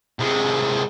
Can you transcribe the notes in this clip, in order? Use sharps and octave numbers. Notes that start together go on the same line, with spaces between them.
C3 G#3